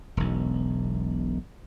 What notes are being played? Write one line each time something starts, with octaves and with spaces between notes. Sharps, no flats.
E1 B1